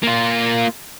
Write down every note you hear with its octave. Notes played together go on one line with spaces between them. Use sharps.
A#3 F4